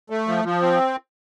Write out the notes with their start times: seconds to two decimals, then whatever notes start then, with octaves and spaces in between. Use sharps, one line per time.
0.10 A3
0.28 F3
0.44 F3
0.62 C4